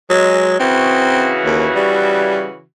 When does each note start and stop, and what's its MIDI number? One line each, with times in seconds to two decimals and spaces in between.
0.10 0.56 54
0.10 0.54 56
0.60 2.62 49
0.60 2.62 52
0.60 1.32 60
0.60 2.62 66
1.46 1.67 39
1.76 2.46 55